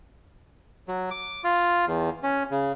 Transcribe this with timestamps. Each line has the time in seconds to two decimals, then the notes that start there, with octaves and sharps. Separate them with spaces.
0.88 F#3
1.11 D6
1.44 F4
1.87 E2
2.23 C#4
2.51 C#3